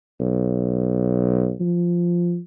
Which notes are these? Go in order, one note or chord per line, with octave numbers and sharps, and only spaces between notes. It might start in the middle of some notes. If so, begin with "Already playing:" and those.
B1
F3